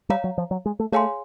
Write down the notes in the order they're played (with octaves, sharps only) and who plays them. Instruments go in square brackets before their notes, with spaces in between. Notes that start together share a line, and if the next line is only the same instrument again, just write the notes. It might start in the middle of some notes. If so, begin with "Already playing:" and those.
[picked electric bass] G3 [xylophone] C#5 F5 A#5
[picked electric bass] F#3
F3
F#3
G#3
A3
[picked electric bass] A3 [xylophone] G#4 C#5 F5 G#5 C6